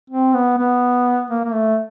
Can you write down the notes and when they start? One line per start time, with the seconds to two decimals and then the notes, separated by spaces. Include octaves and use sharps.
0.10 C4
0.34 B3
0.58 B3
1.30 A#3
1.45 A#3
1.53 A3